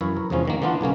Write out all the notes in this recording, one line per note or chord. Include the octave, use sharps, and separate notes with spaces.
F#2 E3 E4 C#5 F5
A#4
E2 G#2 C3 F3 C#4
G2 D#3 A#3
D3 E3 B3 D4 F4
B1 C#3 A#3 C#4